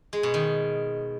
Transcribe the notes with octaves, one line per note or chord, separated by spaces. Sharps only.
G#3
B2
D#3